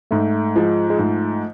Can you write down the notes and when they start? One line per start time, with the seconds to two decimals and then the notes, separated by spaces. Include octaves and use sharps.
0.11 G#2 A3
0.56 F3 G#3
0.90 G#3
0.99 G#2 A3